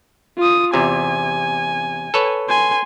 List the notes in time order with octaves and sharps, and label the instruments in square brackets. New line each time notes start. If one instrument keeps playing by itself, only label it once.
[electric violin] F4 D#6
[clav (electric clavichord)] E2 C3 [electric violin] G#5
[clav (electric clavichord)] A4 B4 C#5
[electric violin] G#5 C6